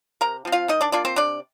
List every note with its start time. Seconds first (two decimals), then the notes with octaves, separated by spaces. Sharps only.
0.21 C3 A#4 A#5
0.45 F3 C4
0.52 F4 F5
0.68 D#3 D#4 D#5
0.81 D4 D5
0.92 A#3 D4 F4 D5
1.05 C4 C5
1.16 C3 D4 D5